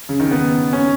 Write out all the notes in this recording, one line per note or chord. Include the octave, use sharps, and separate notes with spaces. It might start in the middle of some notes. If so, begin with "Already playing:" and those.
C#3
D#3
B3
C#4